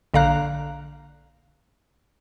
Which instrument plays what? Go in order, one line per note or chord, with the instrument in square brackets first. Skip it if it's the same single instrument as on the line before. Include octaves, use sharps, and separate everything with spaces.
[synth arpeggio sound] A#1 D3 D5 F5 A#5 F#6